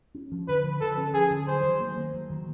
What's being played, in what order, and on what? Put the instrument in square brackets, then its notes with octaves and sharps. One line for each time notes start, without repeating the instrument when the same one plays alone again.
[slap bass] C#4
F3
[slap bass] D3 [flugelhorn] B4
[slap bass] F3
[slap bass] D3 [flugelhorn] A4
[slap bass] C#4
[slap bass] F3 [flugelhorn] G#4
[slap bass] D3
[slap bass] F#3 [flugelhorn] C5
[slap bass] D#3
A#3
A#3
F#3
D#3